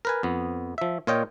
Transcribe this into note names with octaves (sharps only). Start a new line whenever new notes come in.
A#4 B4 G#5
F2 B3
F3 E5
A#2 F4 C#5 D#5 G5